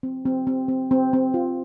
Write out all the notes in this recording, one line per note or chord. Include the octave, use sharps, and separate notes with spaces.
C4
C4
C4
C4
C4
C4
F4